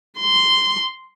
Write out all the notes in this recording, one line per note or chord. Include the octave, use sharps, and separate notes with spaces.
C6